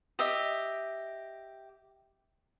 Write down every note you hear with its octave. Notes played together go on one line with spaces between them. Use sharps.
G4 D#5 E5